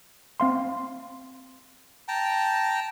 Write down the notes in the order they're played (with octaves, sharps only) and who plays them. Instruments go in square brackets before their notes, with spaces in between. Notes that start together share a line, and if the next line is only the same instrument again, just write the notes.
[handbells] C4 F5 C6
[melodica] G5 A5 A#5